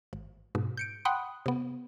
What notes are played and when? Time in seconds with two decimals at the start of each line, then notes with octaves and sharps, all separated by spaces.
0.13 G#1
0.55 G#2 B2
0.77 G6 C#7 D7
1.05 F#5 G5 B5 C6 D#6 F#6
1.46 C3 B3